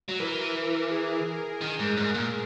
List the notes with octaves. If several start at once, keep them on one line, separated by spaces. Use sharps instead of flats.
F#3
E3 A#4
G#4
D#3
G#2
G#2
A#2